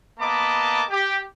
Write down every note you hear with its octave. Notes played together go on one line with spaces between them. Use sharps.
A#3 B3 D#5 A5 B5 D6
G4